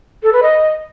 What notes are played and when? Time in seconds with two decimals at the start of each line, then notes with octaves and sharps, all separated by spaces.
0.23 A4
0.33 B4
0.43 D#5